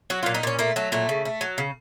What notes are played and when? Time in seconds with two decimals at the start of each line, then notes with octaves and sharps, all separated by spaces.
0.10 F#3 F#4
0.23 A#2 F4
0.34 D#4
0.43 A#2 C#4
0.59 A3 A#3
0.76 F#3 A3
0.92 A#2 A3
1.09 C#3
1.25 A3
1.41 F#3
1.58 C#3